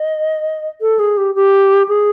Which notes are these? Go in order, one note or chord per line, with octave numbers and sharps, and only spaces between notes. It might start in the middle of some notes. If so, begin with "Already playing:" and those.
Already playing: D#5
A4
G#4
G4
G4
G#4